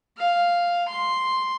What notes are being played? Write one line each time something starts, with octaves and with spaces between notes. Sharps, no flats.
F5
C6